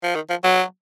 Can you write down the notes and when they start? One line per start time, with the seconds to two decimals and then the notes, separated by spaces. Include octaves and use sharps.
0.03 F3
0.15 D#3
0.30 F3
0.44 F#3